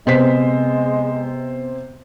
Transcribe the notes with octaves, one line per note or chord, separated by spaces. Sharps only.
C3 G#3 B3 C5 B6